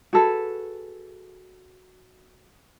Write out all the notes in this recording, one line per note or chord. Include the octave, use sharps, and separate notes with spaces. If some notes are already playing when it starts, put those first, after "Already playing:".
F#4 G#4 A4 B4